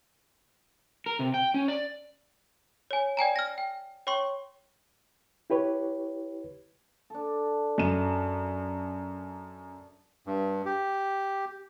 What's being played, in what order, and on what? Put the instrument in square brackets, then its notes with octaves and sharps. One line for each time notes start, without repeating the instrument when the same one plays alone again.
[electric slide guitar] A#4
C3
G5
C#4
D5
[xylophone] C#5 G#5
D5 G5 G#5 A#5
F6 A#6
G5
C#5 G5 C6 C#6
[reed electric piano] E4 G4 B4 C#5
[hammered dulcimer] D4 A4
[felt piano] F#2 E7
[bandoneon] G2
G4